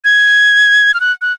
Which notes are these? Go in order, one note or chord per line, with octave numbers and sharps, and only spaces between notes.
G#6
F6
F#6
F#6